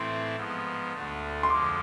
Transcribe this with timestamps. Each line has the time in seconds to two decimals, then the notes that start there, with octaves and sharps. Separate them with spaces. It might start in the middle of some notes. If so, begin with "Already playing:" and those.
Already playing: A2 E3 A3 C4 E4 C6
0.36 G#2 F3 B3
0.93 D2 D3 A3
1.43 C6
1.50 F2 D3 F3 G#3 D6